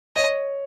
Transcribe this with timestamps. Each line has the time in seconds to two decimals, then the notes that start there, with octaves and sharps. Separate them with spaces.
0.16 C#5 D#5